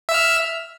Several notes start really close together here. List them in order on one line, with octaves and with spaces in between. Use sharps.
E5 E6 F6